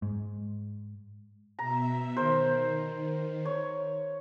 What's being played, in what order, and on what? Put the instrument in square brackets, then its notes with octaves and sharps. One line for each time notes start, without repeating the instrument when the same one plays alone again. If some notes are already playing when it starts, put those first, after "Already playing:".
[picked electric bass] G#2
[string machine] B2 E5 [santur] A#5
[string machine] D#3 [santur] A#4 C5
[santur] C#5